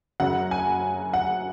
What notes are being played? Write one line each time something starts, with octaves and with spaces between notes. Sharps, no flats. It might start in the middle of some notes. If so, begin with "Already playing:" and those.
F#2 C#3 F#3 F#5
G#5
F#5